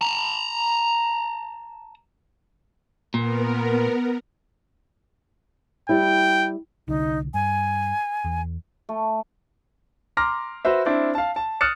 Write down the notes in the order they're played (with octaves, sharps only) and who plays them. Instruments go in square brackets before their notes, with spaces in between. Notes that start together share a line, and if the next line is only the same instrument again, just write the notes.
[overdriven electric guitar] A5 A#5
[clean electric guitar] A#2 [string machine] B3 A#4
[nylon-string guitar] G3 E4 [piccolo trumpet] G5
[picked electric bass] C2 D3 [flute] D#4
[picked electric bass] G2 [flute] G#5
[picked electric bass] E2
[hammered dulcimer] A3
[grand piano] A#5 C6 D6 F6 A#6
F#4 B4 C5 E5
C4 D4 E4
F5 A5
A5
D#6 F6 F#6 A6 C#7 E7